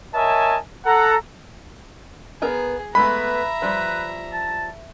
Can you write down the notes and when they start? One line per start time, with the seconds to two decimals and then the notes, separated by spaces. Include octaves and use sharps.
0.14 A#4 C#5 D#5 E5 G#5 A5
0.85 A4 F#5 A#5
2.42 B3 G#4 A#4 A#5
2.95 G#3 A3 B3 B4 E5 A#5 B5
3.62 F3 G3 B4
4.33 A5